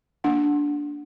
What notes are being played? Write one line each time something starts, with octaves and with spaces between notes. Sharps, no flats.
A#3 D4 F#5